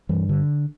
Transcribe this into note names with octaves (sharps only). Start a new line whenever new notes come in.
G2 E3
D3